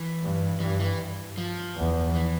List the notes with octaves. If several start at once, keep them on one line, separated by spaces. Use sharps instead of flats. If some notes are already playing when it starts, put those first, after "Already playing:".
Already playing: E3
G2
G2 E3
E3
F3
E2
E3